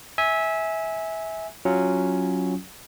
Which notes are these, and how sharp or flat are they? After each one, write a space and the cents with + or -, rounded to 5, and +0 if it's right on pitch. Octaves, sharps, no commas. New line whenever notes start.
E5 -20 G#5 +0
F#3 +0 C#4 +0 F4 +0